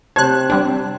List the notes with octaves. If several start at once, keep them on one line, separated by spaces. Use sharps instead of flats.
C3 C5 C#5 A5 F#6 G#6
G3 C4 D4